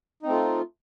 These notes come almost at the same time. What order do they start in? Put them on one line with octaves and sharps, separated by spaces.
D#4 C4 A3 F4